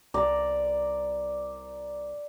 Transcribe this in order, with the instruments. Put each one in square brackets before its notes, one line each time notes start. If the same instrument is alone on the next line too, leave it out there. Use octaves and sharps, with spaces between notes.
[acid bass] C2 [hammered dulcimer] D5 A#5